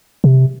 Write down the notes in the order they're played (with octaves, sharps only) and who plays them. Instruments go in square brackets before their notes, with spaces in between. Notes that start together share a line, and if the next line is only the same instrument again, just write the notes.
[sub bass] C3